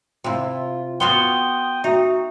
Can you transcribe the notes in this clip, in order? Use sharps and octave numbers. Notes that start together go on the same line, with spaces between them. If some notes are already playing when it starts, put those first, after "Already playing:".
C3 E4 F4
B3 F4 F#4 G5 C6 D#6 G7
D#4 F#4 E5